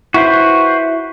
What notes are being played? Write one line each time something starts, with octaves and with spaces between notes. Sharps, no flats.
E4 F#4 B4 C5